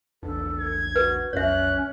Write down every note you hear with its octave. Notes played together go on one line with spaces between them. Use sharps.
A#1 E2 D4 A4
G#6
F#4 B4
B1 F2 F#3 C#4 C#5 E5 F#6